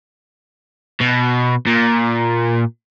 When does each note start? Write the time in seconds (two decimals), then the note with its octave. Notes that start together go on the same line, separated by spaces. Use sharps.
1.01 B2
1.67 A#2